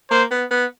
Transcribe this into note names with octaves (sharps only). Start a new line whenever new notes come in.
A#3 C5
B3
B3